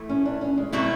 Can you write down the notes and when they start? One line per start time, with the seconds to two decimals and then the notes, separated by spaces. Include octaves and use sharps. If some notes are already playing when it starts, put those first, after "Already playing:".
Already playing: A2 E3 A3
0.09 C#4
0.25 D4
0.41 C#4
0.57 G#3
0.72 B2 F#3 G3 A3 C4 E4